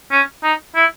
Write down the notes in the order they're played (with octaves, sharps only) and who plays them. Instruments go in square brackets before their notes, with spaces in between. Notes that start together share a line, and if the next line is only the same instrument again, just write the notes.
[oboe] C#4
D#4
E4